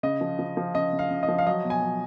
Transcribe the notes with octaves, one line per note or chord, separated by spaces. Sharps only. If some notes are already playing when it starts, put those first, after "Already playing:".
C#3 D#5
F3
F3
F3
C#3 D#5
C#3
F5
C#3
D#5
F3
F5
F#3 D#5
B2
G#5
F#3